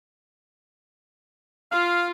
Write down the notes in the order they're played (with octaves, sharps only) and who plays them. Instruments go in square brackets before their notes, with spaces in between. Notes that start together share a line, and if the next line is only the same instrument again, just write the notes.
[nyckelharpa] F4 [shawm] F5